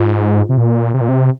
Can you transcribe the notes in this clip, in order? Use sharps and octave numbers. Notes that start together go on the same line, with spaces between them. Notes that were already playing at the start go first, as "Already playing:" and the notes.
Already playing: G#2 F4
C3
A#2
C3
A#2
C3